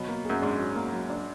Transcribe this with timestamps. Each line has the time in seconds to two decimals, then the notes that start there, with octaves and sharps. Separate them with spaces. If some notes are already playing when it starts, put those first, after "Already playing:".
Already playing: B2 F#3
0.08 A#3
0.25 F#2 G#4
0.42 G#2 D4
0.59 F#3
0.75 A#3
0.92 F#3
1.10 D4